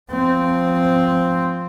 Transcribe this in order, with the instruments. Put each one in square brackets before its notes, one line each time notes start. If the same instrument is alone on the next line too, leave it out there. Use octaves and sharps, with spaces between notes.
[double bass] F3 C4